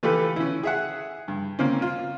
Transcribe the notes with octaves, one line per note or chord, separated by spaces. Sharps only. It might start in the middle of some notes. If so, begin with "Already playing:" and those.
E3 A3 F4 G4 A4 B4
C#4 E4
G#4 E5 F#5
G2
A#3 C4 C#4
F4